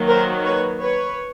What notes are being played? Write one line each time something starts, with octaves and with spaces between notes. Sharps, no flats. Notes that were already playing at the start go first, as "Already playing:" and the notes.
Already playing: D#3 F#3 A#3
A#4 C5
B4 C#5
B4 C#5